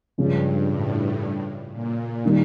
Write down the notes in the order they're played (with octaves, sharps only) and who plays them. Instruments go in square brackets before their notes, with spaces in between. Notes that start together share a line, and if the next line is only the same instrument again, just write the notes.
[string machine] G2 [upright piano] C#3 F3 G#3 C#4
[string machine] A2
A#2
[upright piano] D#3 G3